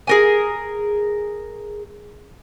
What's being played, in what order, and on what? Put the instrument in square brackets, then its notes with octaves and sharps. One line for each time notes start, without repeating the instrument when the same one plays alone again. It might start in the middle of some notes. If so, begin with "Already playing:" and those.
[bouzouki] G#4 A#4 G#5